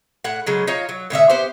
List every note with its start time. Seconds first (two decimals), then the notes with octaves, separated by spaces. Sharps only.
0.24 A2 F#5
0.47 C#3 F#3 G#3
0.67 D#4 F4 C#5 A#5
0.89 F#3
1.10 A2 D3 D#5 E5
1.30 B3 G4 C5